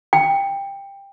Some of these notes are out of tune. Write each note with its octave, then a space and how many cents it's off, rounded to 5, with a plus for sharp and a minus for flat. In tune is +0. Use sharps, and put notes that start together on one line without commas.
G5 +15